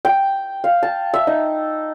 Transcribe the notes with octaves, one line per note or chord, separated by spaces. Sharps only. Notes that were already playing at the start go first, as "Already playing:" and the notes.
G5
F5
A5
E5
D#4